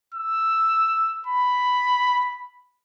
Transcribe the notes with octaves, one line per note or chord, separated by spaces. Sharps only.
E6
B5